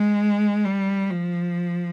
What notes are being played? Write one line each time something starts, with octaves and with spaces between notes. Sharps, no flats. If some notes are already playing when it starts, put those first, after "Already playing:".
Already playing: G#3
G3
F3